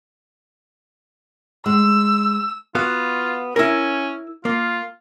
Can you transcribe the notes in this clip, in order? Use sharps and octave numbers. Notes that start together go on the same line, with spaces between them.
G#3 E6
B3 F4 F#4 F5
C#4 E4 A#4
A#3 F4